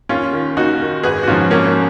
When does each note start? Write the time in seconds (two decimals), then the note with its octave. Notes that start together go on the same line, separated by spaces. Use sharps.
0.09 D#2 C#4 F4
0.33 D#3
0.57 D#2 D#4 F#4
0.81 D#3
1.03 G#1 G#4 B4
1.23 F#4
1.27 G#2 F3 C#4 F4
1.51 G#1 A#3 C#4